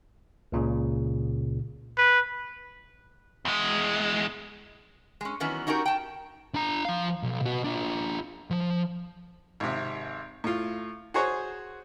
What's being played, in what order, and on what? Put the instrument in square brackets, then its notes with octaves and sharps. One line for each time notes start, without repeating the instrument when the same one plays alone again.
[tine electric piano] C#2 A#2 C#3
[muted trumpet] B4
[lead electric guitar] E2 G#3
[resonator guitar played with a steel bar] G#3 C#4
D#3 E3 F#3 B3 C#4
C#4 D#4 F#4 G4 A#4
G5 A5
[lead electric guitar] D4 A#5
F3 F5
B1
B2 F#4
D4 F4
F3
[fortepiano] G#1 C3
A2 F4
F#4 G#4 C5 C#5